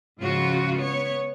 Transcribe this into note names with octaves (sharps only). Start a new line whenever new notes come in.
G#2 C#3 F3 F4 F#4
B3 C#5